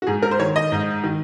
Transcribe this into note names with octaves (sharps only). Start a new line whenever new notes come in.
F#4
G#2 G#4
A#4
C5
D#3 C#5
D#5
G#2
D#3